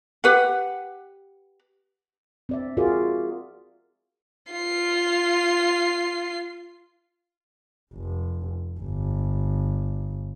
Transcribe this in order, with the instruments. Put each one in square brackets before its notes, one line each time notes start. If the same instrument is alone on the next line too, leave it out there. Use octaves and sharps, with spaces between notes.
[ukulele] G4 B4 F#5
[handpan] C4 D5 E5
F4 F#4 G#4 A#4 D5
[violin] F4 C7
[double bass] F1
G1